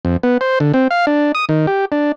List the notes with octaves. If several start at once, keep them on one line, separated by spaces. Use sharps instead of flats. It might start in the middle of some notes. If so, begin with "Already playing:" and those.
F2
B3
C5
D3
C4
F5
D4
D#6
D#3
G4
D4